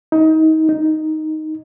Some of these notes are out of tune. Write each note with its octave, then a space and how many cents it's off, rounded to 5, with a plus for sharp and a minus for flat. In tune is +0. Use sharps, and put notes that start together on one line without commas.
D#4 +30
D#4 +5